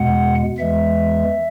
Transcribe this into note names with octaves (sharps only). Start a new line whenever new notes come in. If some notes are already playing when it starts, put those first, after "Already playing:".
Already playing: E2 B2 G#3 F#5
E2 E3 G#3 E5